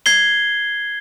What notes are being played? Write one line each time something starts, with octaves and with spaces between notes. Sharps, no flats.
G#6 C7 G7